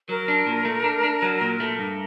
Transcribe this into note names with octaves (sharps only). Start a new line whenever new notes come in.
F#3 A#4
D4
A#2
A3
D4
D4
F#3
A#2
A3
G2